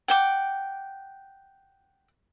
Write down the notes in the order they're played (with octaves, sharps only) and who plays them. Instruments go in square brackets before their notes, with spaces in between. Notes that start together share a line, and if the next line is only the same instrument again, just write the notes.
[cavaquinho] F#5 G5 D6